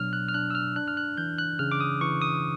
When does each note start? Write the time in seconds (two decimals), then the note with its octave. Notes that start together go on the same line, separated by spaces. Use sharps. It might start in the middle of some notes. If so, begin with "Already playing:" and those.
Already playing: B2 F#3 D4 F6
0.13 F#6
0.29 F6
0.34 D4 F#6
0.50 E6
0.55 F6
0.76 D4 F#6
0.88 F6
0.97 F#6
1.18 E3 G6
1.38 F#6
1.59 C#3 F6
1.72 D6
1.80 D#6
2.01 E3 C#6
2.22 D#6